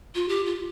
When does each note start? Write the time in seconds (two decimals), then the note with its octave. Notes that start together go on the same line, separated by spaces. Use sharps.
0.15 F4
0.28 G4
0.46 F4